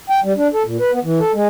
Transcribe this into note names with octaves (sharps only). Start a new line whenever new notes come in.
G5
G3
D4
A4
A#2
B4
B3
E3
A4
G#3